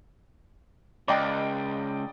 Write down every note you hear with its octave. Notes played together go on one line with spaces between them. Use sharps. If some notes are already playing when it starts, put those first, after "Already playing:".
C#2 D5 D#5 G5